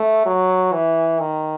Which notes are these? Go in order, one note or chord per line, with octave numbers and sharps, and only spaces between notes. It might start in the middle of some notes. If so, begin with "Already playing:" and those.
Already playing: A3
F#3
E3
D#3